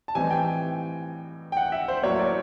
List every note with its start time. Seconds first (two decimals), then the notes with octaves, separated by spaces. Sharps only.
0.08 A5
0.15 A2 E3 G3 C4 D#4 G#5
0.30 G5
1.52 G5
1.57 F#5
1.72 E5
1.88 C5
2.03 A2 F#3 A#3 C#5
2.19 D5